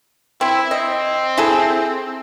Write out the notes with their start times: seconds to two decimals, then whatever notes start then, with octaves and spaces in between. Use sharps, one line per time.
0.41 C4 E4
0.71 C4 D#5
1.38 E4 G#4 A4